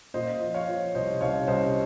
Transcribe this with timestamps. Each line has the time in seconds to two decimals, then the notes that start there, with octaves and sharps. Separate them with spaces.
0.14 A#2 C5 D#5
0.41 F3
0.54 C#5 F5
0.68 F3
0.95 C2 C5 D#5
1.21 C2 C#5 F5
1.48 C2 C5 D#5